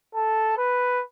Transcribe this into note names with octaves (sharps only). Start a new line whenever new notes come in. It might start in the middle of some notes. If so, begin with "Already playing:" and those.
A4
B4